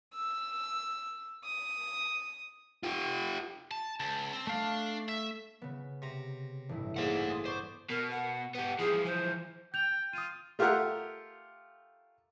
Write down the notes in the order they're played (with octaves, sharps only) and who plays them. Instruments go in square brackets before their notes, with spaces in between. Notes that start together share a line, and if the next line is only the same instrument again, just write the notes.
[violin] E6
D#6
[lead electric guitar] F4 G4
[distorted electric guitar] A5
[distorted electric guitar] C#2 [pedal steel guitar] A5
[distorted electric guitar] C4
[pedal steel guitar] A3 F5 [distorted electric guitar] D4
[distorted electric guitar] E5
[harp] C#3 B3
[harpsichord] C3 A#5
[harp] A1 G2 E4
[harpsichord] A#2 A#3 G#4 [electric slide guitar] A3 C5 F#5
[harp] C6 D#6 A6
[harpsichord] B3 [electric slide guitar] C5 [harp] D5 C#6
[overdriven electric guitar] B2 [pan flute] A#4
[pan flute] F#5
[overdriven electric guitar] B3 G4 [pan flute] F#5
[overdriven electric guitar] E3 F3 [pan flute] G#4
[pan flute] C5
[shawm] G5 [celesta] G6 F7
[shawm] F4 [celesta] D#6 D#7
[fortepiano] A3 F4 G4 A#4 E5 F#5